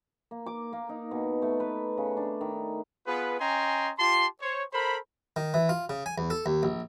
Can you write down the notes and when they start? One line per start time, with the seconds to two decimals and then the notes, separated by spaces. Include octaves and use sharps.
0.31 A#3
0.46 D6
0.73 A#3
0.89 D#4
1.11 B2
1.42 A3
1.60 B4
1.97 C#3
2.17 D4
2.41 D#3
3.07 B3 F4 G#4 B4
3.40 C#4 D#5 G5 G#5 A#5 C6
3.99 F4 G4 A5 C6
4.41 C5 C#5
4.73 A4 A#4 C5 B5
5.36 D#3
5.54 E3
5.69 F4
5.89 C#3
6.06 G#5
6.18 E2
6.30 A4
6.46 D#2
6.63 A#1